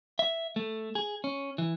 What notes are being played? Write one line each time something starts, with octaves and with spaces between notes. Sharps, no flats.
E5
A3
G#4
C#4
E3